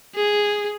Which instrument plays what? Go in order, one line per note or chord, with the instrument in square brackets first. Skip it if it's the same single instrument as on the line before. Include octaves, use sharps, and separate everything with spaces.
[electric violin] G#4